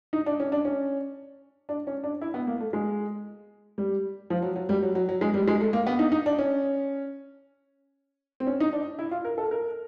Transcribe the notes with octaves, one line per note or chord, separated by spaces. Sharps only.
D#4
D4
C#4
D4
C#4
D4
C#4
D4
E4
B3
A#3
A3
G#3
G3
F3
F#3
F#3
G3
F#3
F#3
F#3
G#3
G3
G#3
A3
A#3
B3
D#4
D#4
D4
C#4
C4
C#4
D#4
D4
E4
F4
A#4
A4
A#4